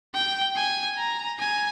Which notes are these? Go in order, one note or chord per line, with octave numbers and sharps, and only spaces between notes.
G5
G#5
A#5
G#5